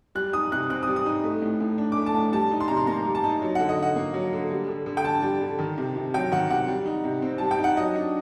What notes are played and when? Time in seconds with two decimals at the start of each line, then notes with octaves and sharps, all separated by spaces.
0.15 G3 F#6
0.33 D#4 D#6
0.52 C3 F#6
0.70 C4 F#6
0.83 D#6
0.87 G3
0.96 D#6
1.06 D#4
1.24 A3
1.42 A2
1.60 A2
1.78 D4
1.92 A3 D6
2.06 A5
2.14 A2
2.32 G3 A5
2.51 D#4
2.60 C6
2.68 C3 A#5
2.77 C6
2.87 A#3 A#5
3.05 G3
3.15 A5
3.24 D#4
3.42 F#3
3.55 D3 F#5
3.69 D#5
3.77 D3
3.83 F#5
3.96 A#3
4.14 F#3
4.33 D3
4.51 G3
4.68 D3
4.86 D3
4.97 G5
5.04 D4 A5
5.22 G3
5.41 D3
5.59 D#3
5.78 C3
5.96 C3
6.14 F#3 G5
6.32 D#3 F#5
6.50 C3 F#5
6.68 G3
6.86 D#4
7.04 C3
7.22 C4
7.38 G3 A5
7.51 G5
7.59 D#4
7.64 F#5
7.77 F#3 D#5
7.95 D4